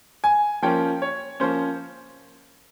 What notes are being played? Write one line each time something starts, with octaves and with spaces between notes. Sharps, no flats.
G#5
F3 A#3 C#4 G5
C#5
F3 A#3 C#4 C5